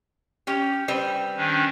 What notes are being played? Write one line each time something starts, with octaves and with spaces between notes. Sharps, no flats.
C#4 G4
G3 C4 B4
D#3 C#4 D4